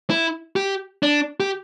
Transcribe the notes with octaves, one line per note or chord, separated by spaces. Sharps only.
E4
G4
D4
G4